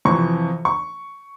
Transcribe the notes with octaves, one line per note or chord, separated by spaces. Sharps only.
F2 C3 E3 C#6
C#6